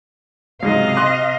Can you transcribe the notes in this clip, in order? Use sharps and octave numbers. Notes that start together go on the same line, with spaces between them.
C#2 G#2 C3 F#3 D#5 F5
C6 D6 F#6